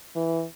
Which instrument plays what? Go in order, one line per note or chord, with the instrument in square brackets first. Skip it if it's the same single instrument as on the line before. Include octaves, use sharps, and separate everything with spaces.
[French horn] E3